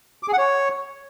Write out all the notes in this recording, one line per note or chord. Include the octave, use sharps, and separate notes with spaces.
D6
G#4
F#5
C#5